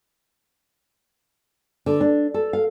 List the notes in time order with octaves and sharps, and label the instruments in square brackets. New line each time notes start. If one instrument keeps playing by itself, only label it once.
[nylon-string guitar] D3
D4
A4
F5